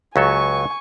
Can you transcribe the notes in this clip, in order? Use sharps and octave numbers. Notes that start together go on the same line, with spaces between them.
C#2 F#3 A4 G#5 C#6